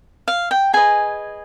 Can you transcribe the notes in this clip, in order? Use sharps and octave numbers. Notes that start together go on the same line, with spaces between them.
F5
G5
G#4 B4 D#5 G#5